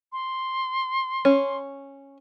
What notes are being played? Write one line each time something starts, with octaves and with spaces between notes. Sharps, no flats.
C6
C#4